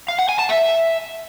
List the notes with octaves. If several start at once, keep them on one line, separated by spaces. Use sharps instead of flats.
F5
F#5
G#5
A5
E5